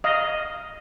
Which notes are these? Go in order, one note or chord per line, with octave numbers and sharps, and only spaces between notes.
D#5 F5